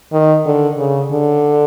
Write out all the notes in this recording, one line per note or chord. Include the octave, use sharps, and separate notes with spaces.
D#3
D3
C#3
D3